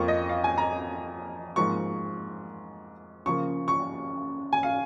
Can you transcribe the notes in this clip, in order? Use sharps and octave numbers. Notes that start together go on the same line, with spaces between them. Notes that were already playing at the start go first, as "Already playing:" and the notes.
Already playing: F2 F3 A#3 C#6
D#5
F5
G#5
A#5
G#2 F3 A#3 C#6
C#3 F3 A#3 C#6
C#6
G#5
F5